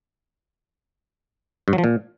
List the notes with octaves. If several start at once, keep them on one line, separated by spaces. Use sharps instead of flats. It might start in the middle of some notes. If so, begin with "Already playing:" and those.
G2
F#3
F3
A#2